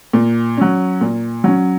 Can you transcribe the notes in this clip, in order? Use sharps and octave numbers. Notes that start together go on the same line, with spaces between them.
A#2
F#3 C#4
A#2
F#3 C#4